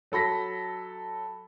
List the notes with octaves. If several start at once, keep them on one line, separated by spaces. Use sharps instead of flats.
F#3 A4 B5 A#6 B6